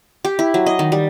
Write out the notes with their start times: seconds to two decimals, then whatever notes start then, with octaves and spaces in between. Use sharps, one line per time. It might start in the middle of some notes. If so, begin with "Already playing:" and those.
0.25 G4
0.39 E4
0.54 F#3
0.66 D#5
0.79 D#3
0.92 G3